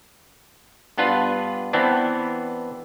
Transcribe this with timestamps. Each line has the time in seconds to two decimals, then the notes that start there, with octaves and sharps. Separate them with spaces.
0.98 G2 B3 D4 F4 B4
1.73 E3 B3 C4 D4